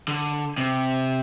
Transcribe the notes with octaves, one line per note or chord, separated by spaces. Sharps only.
D3
C3